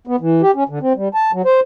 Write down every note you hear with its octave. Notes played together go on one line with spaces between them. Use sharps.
B3
E3
G4
C#4
D3
C4
G3
A5
F#3
C5